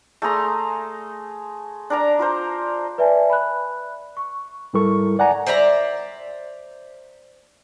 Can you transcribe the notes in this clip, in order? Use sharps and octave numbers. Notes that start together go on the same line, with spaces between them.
A3 G#4 A#5 C6
D4 A#4 A#5
F4 A#4 C5
B4 D5 E5 G#5 A5
B5 F#6
C#6
G#2 G3 E4 A4 A#4 C#6
D5 F#5 G#5 A#5
C5 D5 E5 A#5